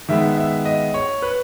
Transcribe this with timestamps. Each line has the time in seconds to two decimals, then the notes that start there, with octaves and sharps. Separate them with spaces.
0.09 D#3 G#3 B3 E5
0.38 E5
0.65 D#5
0.94 C#5
1.22 B4